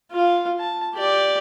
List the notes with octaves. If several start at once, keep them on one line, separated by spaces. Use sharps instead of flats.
F4 F5
A5
G4 D5